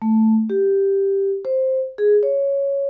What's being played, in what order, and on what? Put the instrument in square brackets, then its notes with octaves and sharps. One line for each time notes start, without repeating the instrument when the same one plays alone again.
[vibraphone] A3
G4
C5
G#4
C#5